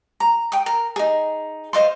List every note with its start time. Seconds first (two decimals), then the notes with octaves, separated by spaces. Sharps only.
0.20 A#5
0.52 G5 D#6
0.66 A#4
0.96 D#4 G#4
1.73 C5 D#5 F5 C6